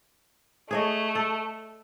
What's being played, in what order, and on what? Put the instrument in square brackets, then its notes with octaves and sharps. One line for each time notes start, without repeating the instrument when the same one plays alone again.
[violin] A3 [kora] G#4 C#5 D#5
[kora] A4